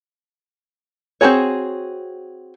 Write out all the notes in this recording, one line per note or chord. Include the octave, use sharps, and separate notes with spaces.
C4 D#4 F#4 G#4 C#5